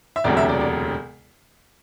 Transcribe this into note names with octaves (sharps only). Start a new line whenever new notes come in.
E5
E1 D2 C3 F#3 D5
E5
D5
D5